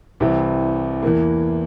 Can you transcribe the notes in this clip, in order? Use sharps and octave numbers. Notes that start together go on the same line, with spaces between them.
C2 C3 E3
E2 E3 A#3